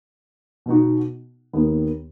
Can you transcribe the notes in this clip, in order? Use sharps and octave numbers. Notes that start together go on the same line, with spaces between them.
B2 B3 D#4 F#4
D#2 D#3 B3